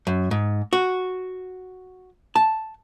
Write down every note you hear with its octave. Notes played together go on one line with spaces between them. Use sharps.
F#2
G#2
F#4
A5